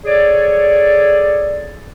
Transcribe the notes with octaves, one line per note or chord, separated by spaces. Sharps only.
G#4 A4 C#5 D5